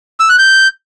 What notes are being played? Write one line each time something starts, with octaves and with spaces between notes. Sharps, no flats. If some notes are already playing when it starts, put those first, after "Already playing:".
E6
F#6
G6